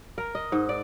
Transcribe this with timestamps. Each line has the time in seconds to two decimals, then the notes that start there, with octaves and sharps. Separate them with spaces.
0.18 A#4
0.35 D#5
0.52 G#2
0.69 D5